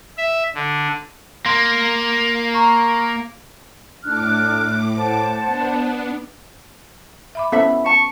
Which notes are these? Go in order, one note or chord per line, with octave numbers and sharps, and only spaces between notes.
E5
D3
A#3 C6
A#5 C#6
A2 D4 D6 F6 F#6
C5 F#5 A5
B3 D4
E5 B5 D6
B3 C#4 E4 A4 C5 E5 B5
A5 C#6